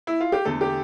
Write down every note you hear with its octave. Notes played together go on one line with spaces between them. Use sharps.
E4
F4
G4
E2 D3 A3 A4
G4